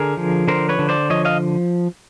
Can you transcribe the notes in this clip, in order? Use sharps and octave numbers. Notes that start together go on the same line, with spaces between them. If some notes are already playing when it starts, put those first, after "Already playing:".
Already playing: D3 G#4 A#4
F3
D3 A#4 C5
B4 C#5
D3
C5 D5
F3 C#5 D#5
D#5 F5